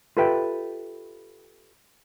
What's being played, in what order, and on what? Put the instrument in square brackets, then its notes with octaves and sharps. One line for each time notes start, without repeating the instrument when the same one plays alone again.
[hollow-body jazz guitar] F4 G4 A4 B4 E5 G5